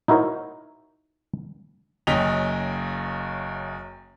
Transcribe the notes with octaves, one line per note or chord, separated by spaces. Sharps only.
D#4 E4 F#4 A#4 C5 C#5
F#1 F#2 D#5 G5 B6 F7